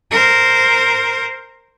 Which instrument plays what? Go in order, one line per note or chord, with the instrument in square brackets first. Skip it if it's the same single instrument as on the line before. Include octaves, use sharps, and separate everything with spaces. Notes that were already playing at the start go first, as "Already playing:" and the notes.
[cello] A#4 C5